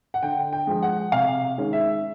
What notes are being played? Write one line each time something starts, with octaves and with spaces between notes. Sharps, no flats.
F#5
D3 G5
G5
F3 G#3
F#5
C3 F5
D#3 G#3 C#4
E5